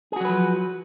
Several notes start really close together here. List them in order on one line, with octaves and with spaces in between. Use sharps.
G#4 F#4 F#3 B4 F3